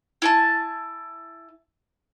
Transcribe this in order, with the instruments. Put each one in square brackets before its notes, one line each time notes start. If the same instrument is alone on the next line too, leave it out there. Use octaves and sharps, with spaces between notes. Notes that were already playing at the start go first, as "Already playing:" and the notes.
[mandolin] E4 G#5 A5